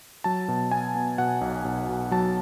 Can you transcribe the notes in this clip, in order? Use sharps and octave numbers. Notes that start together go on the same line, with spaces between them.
F#3 A5
B2
B3 G#5
B3
B2 F#5
B1
B1
B1
F#3 A5